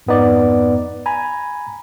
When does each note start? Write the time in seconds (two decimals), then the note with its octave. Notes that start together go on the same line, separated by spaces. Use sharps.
0.06 F2 G#2 B3 D#4 D5
1.06 G#5 A#5 B5